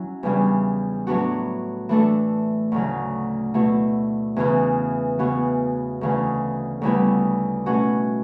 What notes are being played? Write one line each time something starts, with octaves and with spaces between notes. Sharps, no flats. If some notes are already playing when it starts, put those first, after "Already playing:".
Already playing: F#3 C#4 E4
E2 C#3 E3 G3 D4
A2 F#3 B3 D4 F#4
E3 A3 D4 A4
D2 C#3 F#3
B2 A3 E4
E2 C#3 E3
C#3 E3 B3 F#4
D2 C#3 E3
D2 C#3 G3 B3 E4
B2 A3 C#4 F#4